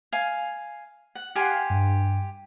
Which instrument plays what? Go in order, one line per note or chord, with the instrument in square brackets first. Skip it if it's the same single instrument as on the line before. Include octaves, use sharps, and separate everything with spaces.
[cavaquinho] F5 G#5
F#5
[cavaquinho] G4 G#5 C6 [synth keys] F5 F#5
[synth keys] G2